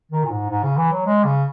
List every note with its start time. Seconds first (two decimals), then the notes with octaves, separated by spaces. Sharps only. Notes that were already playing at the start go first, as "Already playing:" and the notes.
0.11 D#3
0.24 A#2
0.30 G#2
0.49 G#2
0.63 C#3
0.77 E3
0.91 F#3
1.05 G#3
1.24 C#3